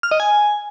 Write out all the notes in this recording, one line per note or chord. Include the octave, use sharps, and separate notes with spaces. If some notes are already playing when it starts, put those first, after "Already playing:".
F6
D#5
G#5